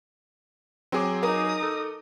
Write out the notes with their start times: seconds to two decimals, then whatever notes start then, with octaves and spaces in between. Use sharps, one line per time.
0.92 F#3 C4 G#4 D6
1.23 D#4 A#4 D#6
1.63 A4